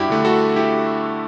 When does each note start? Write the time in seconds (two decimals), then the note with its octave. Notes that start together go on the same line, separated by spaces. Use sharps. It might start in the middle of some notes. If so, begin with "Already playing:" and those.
Already playing: G2 D4 E4 F#4 G4
0.10 D3 A3
0.25 F#4 A4
0.56 E4 G4